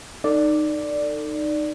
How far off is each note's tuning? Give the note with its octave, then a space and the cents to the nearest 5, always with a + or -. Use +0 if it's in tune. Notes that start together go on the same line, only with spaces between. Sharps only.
D#4 -20 A4 +30 D5 +0